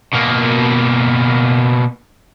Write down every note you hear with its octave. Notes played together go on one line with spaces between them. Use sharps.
B2 A#3